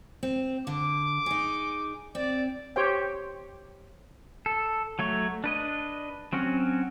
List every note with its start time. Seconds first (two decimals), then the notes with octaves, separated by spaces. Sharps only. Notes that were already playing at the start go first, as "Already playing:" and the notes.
0.23 C4
0.67 D3 D6
1.26 D#4 G#4
2.15 C4 D5
2.76 G4 C5 C#5 G5
4.46 A4
4.99 F#3 A3 C#5
5.44 D4 B4 D#5
6.33 F#3 C4 C#4 F#4